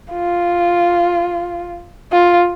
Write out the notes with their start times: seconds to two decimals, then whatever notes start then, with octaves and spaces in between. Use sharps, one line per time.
0.12 F4
2.12 F4